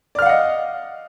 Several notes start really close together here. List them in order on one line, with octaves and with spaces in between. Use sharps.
D5 F6 F5 F#5 D#5